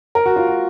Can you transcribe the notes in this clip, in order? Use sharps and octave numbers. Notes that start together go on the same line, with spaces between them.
A#4
F#4
F4
F#4